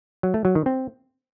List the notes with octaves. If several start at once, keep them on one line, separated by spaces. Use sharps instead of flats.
F#3
A3
F#3
D#3
C4